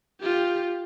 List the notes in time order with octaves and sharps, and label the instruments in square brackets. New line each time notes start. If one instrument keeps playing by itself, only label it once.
[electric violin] F4 G4